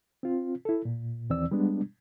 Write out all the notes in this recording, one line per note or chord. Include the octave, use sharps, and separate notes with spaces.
C4 F4
E4 A4
A#2
D#2 E3 C4 D5 E6
G3 G#3 B3 D4